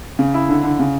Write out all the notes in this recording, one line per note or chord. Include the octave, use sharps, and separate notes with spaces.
C#3
E4
D3
D3
C#3